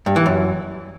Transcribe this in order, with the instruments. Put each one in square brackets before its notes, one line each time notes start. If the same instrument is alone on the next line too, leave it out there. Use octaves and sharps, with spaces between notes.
[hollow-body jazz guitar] G2
E3
F#2